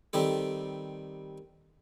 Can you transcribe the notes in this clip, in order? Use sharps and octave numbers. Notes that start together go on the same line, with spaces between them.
D#3 G3 C4 A4